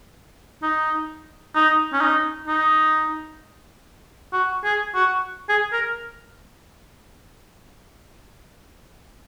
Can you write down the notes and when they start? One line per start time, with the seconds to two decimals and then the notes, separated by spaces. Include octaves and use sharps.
0.62 D#4
1.55 D#4
1.93 C#4
2.01 D#4
2.48 D#4
4.33 F#4
4.64 G#4
4.95 F#4
5.49 G#4
5.72 A#4